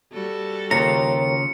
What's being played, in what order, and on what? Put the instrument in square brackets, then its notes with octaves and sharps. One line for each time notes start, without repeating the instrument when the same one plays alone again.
[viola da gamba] G3 F#4 A4
[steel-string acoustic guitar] D#2 [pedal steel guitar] C#3 F4 A#5 [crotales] C#7